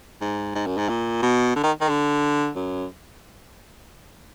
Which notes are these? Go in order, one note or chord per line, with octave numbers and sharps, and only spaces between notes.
G#2
G#2
F#2
G#2
A#2
B2
D3
D#3
D#3
D3
F#2